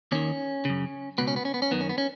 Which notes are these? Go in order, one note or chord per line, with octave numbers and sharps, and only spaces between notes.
D#2 D#3 C#4
F#2 C#3
C#2 B2 B3
C#4
B3
C#4
B3
C#4
F#2 D#3 B3
C#4
B3
C#4